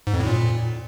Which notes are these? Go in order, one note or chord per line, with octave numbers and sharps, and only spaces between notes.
G#2
F2
A2
A#2